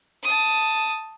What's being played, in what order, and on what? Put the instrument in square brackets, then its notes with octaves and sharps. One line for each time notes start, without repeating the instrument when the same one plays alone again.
[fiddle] A5 D#6